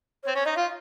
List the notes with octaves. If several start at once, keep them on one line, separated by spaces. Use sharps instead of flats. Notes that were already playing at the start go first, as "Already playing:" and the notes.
C#5
C4
C#4 C#5
D#4 D#5
F4 F5